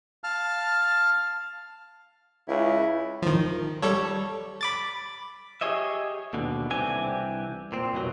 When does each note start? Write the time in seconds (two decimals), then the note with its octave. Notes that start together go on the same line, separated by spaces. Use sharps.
0.24 F5 A5 F6
2.48 C#2 E4
3.22 D#3 F3
3.82 G3 A4 C#5
4.61 B5 D6 A6
5.61 G4 G#4 C#5 D#5 E5
6.33 D#2 B2 D3
6.70 C2 E3 C4 D4 G4 G#5
7.72 A#2 C4
7.93 C2 F2 B2 F#3